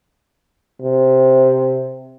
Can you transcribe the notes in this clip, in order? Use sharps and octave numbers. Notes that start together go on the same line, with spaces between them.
C3